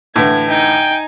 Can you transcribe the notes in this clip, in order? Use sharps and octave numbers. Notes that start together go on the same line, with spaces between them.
A2 D3 E3 G#6
D#4 G5 G#5